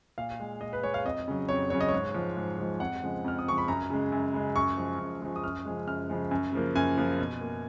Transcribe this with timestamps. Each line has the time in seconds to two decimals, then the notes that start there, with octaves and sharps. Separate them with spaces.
0.18 A#2 F5
0.40 G#3
0.61 A#2 D#5
0.73 B4
0.83 G#3 C#5
0.94 F5
1.05 F2 D#5
1.28 C#3 F#3
1.49 F2 C#5
1.70 C#3 F#3 C#5
1.81 D#5
1.88 G#2 C#5
2.14 F3 G#3
2.37 G#2
2.58 F3 G#3
2.80 F2 F#5
3.03 C#3 F3 G#3
3.24 F2 F6
3.39 D#6
3.46 C#3 F3 G#3 C#6
3.58 B5
3.68 F#2 A#5
3.90 C#3 G#3
4.12 F#2
4.34 C#3 G#3
4.55 F#2 C#6
4.77 F3 G#3
4.99 F#2
5.21 F3 G#3
5.36 D#6
5.44 F#2 F6
5.65 C#3 F3 G#3
5.87 F#2 F6
6.10 C#3 F3 G#3
6.31 F#2
6.53 C#3 F3 A#3
6.75 F#2 G#5
6.97 C#3 F3 A#3
7.19 B2
7.41 A#3